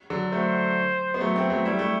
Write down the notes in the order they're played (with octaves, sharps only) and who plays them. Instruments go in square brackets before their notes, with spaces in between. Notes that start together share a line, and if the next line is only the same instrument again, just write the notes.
[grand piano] D3 F#3
[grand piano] F#3 A3 [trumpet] C5
[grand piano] B3
F#3 A3
A3 C4
F#3 A3
[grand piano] G3 [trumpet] E4
[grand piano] A3